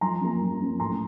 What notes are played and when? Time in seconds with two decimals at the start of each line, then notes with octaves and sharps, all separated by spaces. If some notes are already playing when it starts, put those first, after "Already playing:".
0.01 F3 A#5 C6
0.21 A#3 C#4
0.41 F3
0.60 A#3 C#4
0.80 A2 A#5 C6